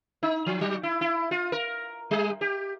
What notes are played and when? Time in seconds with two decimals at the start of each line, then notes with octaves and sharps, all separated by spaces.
0.23 D#4
0.46 F3
0.61 F#3
0.83 E4
1.01 E4
1.31 F4
1.52 A#4
2.11 G3
2.41 G4